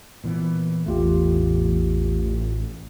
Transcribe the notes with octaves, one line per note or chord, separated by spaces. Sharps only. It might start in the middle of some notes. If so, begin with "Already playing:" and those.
A#2 E3 B3
A1 E2 A3 F4 G4